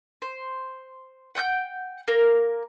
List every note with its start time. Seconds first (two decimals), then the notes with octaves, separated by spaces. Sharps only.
0.22 C5
1.35 F#5 G5 F#6 G6
2.08 A#3 A#4